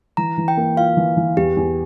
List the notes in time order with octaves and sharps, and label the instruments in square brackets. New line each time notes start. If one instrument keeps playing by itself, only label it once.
[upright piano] E3 [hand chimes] A#5
[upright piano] E3
[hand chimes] G5
[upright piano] A#3
[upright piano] F4 [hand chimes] F5
[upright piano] E3
E3
[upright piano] E2 [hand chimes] G4
[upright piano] E2